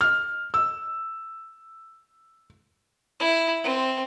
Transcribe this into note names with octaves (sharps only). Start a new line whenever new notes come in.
F6
E6
E4
C4